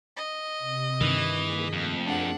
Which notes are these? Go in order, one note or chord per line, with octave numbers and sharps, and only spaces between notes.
D#5
C3
G2 D#3 E3
A#3 G#4 B6
F2 A3 C4
F#2 D4 G#4 A#4 F#5